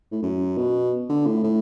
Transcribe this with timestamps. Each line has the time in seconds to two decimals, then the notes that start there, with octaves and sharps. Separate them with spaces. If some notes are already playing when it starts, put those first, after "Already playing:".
0.12 A2
0.23 F#2
0.57 B2
1.09 D3
1.26 A2
1.44 A2